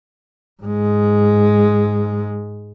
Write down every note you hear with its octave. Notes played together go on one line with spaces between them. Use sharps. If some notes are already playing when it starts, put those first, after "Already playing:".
G#2 G#3